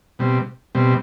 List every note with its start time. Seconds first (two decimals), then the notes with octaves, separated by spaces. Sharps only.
0.19 B2 G3 C4
0.75 B2 G3 C4